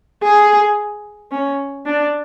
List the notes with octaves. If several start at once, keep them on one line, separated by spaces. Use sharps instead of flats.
G#4
C#4
D4